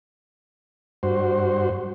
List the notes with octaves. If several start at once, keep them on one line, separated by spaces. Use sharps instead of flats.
G2 F#4 C5